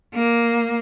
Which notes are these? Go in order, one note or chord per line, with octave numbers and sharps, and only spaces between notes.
A#3